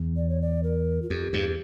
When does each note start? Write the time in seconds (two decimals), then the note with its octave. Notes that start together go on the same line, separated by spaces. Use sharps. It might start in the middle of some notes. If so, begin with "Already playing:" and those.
Already playing: E2
0.17 D5
0.29 C#5
0.41 D5
0.63 A#4
1.02 F4
1.10 F2 G4
1.33 E2 G2